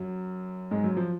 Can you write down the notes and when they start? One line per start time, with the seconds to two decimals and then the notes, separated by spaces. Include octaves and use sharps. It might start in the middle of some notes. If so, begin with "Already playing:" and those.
Already playing: F#2 F#3
0.71 G#2 G#3
0.84 F#2 F#3
0.97 F3